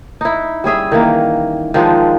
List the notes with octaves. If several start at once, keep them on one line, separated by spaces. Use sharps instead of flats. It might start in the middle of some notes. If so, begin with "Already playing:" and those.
D#4 E4
G3 C#4 G#4 E5
D#3 E3 A#3
D#3 F3 G#3 D4